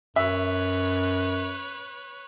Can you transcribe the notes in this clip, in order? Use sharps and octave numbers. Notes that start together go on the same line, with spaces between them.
F#2 B4 C#5 E5